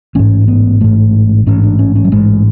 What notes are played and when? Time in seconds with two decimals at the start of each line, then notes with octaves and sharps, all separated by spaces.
0.15 A1 G#2 C#4
0.48 B3
0.81 A1 G#2 A3
1.46 A1 G#2 C#4
1.63 D4
1.79 C#4
1.95 C#4
2.05 F#3
2.12 A1 G#2 G#3